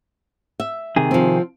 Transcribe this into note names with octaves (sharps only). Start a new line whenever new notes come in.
E5
C3 D#3 G#4
F3 C4